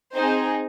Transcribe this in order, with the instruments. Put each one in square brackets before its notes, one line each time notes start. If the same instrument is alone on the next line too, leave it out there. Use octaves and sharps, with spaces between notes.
[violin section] C4 D#4 G#4 C5